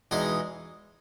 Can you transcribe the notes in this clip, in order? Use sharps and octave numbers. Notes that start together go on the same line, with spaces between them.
E2 B2 G#3 D#4 G#4